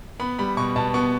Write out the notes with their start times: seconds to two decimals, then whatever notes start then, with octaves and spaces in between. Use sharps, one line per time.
0.20 B3 B5
0.39 G3 B5
0.57 B2 C#6
0.76 B2 A5
0.94 B3 C#6